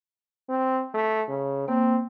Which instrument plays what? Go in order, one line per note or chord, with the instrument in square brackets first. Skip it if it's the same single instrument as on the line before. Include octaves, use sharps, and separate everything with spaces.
[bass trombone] C4
A3
C#3
[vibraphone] A#3 [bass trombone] C4